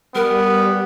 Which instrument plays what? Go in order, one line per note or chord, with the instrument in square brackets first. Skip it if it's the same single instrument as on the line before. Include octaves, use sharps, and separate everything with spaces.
[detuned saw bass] G3 [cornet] B3 [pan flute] A#4